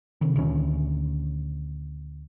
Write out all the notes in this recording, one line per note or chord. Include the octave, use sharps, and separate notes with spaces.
C3 D#3
D2 A#2 D#3 C#4